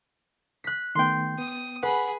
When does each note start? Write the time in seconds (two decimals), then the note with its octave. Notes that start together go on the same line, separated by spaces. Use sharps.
0.64 F#6 B6
0.95 D#3 A3 B3 G5 C6
1.39 B3 D#6
1.83 G#4 B4 F#5 B5